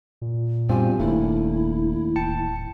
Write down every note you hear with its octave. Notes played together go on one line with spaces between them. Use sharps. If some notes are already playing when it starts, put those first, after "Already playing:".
A#2
G2 B2 C4 F4 G4 G#5
D#1 D#2 A3 A#3 D4 E4
D1 G5 A5 C#7